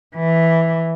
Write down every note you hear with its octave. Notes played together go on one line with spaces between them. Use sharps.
E3